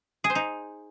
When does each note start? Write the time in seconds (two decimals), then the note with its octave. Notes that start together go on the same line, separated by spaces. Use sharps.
0.24 G#4
0.30 C5
0.35 D#4